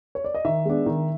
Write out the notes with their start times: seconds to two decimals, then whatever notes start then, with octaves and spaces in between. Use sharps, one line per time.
0.15 C#5
0.24 D5
0.34 D#5
0.45 D#3 E5
0.65 G#3 B3 D4
0.86 D#3